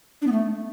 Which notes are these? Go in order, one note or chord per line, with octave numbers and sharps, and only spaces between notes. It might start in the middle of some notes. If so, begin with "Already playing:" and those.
D4
B3
A3